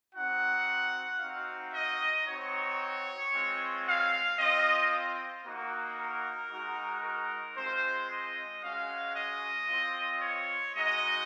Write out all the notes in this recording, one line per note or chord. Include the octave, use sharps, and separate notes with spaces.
C4 D#4 F#4 F#5
C4 D#4 F#4 F5
D#5
C4 D#4 F#4 C#5
G#3 C4 F4
F5
C4 F4 D#5
A#3 D#4 F#4
A#4
G#3 D#4 F#4
A#4
G#3 C4 F4 C5
D#5
G#3 C#4 F#4 F5
D#5
C4 F4
C#5
G#3 D#4 F#4 D#5